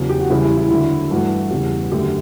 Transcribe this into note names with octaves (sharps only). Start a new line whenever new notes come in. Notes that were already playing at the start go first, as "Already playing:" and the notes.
Already playing: E2 C#3 F#3
G4
F#4
E2 C#3 E3 G3 E4
E4
E4
D2 D3 F#3 A3 E4
G2 E3 A3 F#4
E2 C#3 G3
F#2 D3 A3 G4